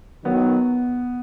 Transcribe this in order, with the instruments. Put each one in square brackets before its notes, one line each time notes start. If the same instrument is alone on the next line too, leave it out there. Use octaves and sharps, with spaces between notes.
[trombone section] D#3 F#3 [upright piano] B3